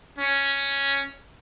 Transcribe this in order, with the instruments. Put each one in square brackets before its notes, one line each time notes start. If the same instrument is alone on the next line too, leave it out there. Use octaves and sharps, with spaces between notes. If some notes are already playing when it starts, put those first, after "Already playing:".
[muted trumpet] C#4